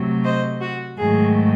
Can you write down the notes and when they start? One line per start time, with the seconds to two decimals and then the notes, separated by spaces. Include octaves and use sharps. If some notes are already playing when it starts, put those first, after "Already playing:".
Already playing: C3 F#3 A3
0.25 C5 D#5
0.62 F#4
0.98 G#2 D#3 F#3 A3 G#4